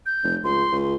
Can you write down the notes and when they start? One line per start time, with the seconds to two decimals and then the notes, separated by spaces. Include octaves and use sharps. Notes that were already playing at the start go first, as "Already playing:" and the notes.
0.06 G6
0.24 F1
0.44 C#2 C6
0.72 C#2